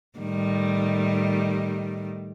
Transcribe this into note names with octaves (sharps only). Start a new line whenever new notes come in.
A2 D#3 G3